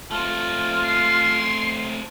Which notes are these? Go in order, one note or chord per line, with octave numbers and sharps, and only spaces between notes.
A3 C4 F4
C6